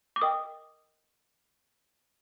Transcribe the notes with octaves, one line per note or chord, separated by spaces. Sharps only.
D6
A#4 D#5 G5 D#6